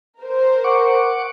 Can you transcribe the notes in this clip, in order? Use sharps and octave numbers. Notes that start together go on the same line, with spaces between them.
A#4 C5
F#5 C#6 D6